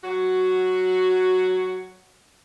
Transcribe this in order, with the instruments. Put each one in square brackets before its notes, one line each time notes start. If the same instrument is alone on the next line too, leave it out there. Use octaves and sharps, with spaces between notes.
[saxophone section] F#3 F#4